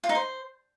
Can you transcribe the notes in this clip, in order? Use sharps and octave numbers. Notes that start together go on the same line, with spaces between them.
F4
D#4
C5